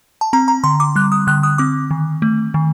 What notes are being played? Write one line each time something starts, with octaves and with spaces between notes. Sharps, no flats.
A5
C4 A#5
A#5
D3 C6
D6
G3 F#6
D#6
D3 F#6
D#6
C4 D6
D#3
A3
D#3